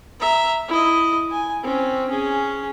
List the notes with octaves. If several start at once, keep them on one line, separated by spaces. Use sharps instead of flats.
E5 A#5
E4 D#5
G#5
C4 C#4
C#4 G#4